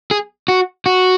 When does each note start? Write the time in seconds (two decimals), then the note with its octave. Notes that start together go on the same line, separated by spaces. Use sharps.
0.11 G#4
0.48 F#4
0.86 F#4